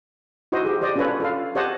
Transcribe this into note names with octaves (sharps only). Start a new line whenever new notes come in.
D#4 E4 F#4 C5 D#5
G4 G#4
G4 C5 D5 D#5
C#4 D4 F4 A4 B4 C#5
F4 A4 F5
G4 C5 C#5 D#5 F#5 A5